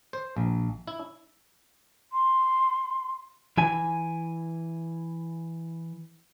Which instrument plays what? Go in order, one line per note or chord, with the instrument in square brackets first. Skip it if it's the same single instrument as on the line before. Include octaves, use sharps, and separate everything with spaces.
[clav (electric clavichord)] C5
A#1
E4
[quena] C6
[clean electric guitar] E3 E4 G#5